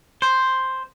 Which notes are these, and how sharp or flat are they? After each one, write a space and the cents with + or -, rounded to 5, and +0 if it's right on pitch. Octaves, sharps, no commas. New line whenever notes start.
C5 +0